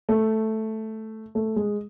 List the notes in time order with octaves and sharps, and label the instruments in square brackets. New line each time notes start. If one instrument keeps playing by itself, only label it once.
[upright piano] A3
A3
G#3